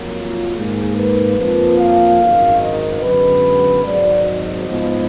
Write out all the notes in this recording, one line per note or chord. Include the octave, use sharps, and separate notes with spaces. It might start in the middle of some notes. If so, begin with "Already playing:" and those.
Already playing: F2 D#3 F#3 A#3
F4
G#2 D#3 A#3 G#4
B4
F2 F3 A#3
F5
G#1 F#2 D#3
D#5
F#2 D3 G#3 B3 B4
G#1 G#2 F#3 D5
D#5
G#2 F3 B3